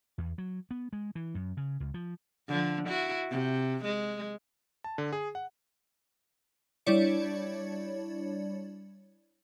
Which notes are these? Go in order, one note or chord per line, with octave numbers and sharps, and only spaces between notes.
E2
F#3
B3
G#3
E3
F#2
C#3
C#2
F3
D3 F3
E4 F#4
C3
G#3
A5
D3
G#4
F#5
G3 D4 E4 C#5 D5 C#7